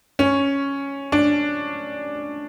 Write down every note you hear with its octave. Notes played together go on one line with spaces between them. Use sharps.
C#4
D4